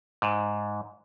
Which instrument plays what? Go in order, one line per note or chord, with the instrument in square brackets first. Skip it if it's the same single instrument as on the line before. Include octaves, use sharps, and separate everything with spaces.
[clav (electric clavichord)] G#2